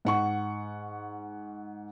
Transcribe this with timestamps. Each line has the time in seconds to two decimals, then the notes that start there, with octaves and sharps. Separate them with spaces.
0.05 G#2 F#5 C#6